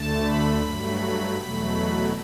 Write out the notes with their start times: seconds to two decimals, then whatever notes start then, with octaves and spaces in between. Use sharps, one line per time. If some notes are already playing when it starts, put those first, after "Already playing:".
Already playing: D2 D3 A3 A5
0.26 B5
0.63 G2 F#3 A3
1.38 E2 B2 F#3 A3